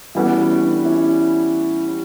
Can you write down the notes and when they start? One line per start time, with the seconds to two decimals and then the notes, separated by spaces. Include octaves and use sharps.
0.15 E3 G3 B3 C#4 F#4 A4
0.38 C#4
0.62 D4
0.85 C#4 E4